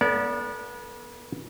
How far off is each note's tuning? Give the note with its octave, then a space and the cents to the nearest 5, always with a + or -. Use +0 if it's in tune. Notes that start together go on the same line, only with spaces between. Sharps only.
B3 -35 A4 +0 D5 -30